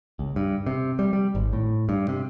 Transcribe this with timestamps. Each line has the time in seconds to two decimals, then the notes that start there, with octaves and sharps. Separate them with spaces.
0.19 C#2
0.36 G2
0.66 C3
0.99 G3
1.13 G3
1.35 G#1
1.53 A2
1.89 G2
2.08 C3